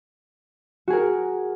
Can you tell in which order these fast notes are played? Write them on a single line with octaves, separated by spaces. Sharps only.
F#4 G#4 A#4